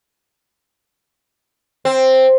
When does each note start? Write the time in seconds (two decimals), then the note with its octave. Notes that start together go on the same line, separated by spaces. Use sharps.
1.85 C4